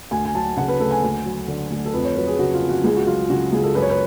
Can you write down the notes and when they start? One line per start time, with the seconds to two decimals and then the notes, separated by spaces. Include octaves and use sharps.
0.11 D2 G#5
0.25 G#5
0.35 F#3 A5
0.57 C#3 F#5
0.68 B4
0.80 D2 A4
0.91 G#5
1.03 D2
1.25 F#3
1.48 D3
1.70 D2
1.86 A4
1.93 F2 B4
2.04 C#5
2.16 F#3 B4
2.27 G#4
2.39 C#3 F#4
2.54 F4
2.62 F2
2.70 F#4
2.84 C#2 G#4
2.96 F#4
3.07 F#3 F4
3.29 C#3 F#4
3.52 C#2 G#4
3.64 A4
3.75 F#2 B4
3.82 C#5
3.90 B4